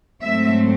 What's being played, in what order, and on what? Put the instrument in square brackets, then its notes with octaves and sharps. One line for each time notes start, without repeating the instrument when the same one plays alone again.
[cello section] G#2 F#3 A3 C4 E5